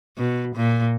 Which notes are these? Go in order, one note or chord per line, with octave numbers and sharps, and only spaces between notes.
B2
A#2